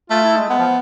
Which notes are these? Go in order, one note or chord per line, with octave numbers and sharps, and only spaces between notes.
A3 F4
E4
G#3
G#3 B3
F3